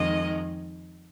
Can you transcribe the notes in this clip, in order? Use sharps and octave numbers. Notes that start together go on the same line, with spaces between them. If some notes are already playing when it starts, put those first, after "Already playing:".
Already playing: F2 D#3 G#3 D#5